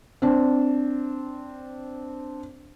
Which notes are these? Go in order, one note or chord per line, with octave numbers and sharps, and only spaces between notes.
C4 D4